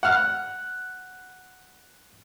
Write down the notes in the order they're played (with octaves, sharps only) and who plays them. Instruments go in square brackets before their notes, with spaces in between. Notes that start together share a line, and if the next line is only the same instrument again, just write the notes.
[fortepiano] F#5 F6